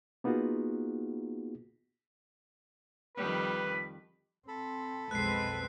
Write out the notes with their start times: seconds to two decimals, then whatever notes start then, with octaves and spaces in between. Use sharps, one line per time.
0.24 A#3 B3 D#4 F4 F#4 G#4
3.17 F2 D#3 G3 B4
4.48 C4 A4 B5
5.11 B1 F2 G#3 C4 B4 F#6 C7